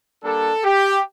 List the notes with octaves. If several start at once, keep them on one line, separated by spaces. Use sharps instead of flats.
G3 A#3 D4 A4
G4